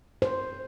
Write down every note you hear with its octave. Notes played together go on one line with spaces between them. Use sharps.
C5